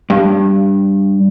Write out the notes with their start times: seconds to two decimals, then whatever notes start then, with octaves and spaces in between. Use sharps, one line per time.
0.10 G2